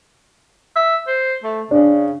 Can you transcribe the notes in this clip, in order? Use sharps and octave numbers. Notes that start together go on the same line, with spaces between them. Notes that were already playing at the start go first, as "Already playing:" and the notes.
E5
C5
A3
C#3 D4